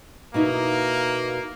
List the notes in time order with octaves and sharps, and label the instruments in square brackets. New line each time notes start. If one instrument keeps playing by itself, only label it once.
[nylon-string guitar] B2 D#4 E4 [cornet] A#3